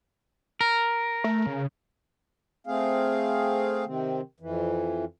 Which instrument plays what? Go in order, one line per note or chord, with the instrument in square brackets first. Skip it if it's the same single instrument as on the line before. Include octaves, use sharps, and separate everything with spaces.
[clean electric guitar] A#4
[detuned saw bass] A3
C#3
[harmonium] A3 C4 G#4 F5
C3 D#3 C4
F2 E3